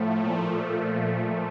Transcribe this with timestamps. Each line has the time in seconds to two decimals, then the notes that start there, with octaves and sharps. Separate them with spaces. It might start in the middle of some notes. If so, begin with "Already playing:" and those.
Already playing: A2 F3 A3
0.24 A#2 F3